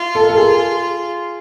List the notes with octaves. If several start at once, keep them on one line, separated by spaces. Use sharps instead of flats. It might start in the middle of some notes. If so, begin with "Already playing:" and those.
Already playing: F4
A4
A#4
A4
G#4